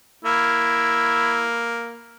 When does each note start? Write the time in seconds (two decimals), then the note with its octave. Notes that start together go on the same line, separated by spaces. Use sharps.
0.25 A#3 E4